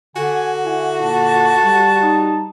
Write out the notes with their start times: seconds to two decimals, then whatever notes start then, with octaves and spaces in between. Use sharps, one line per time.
0.16 D3 F#4 G#5
0.65 E4 G#5
1.02 A#2 A5
1.64 G3
2.02 D#4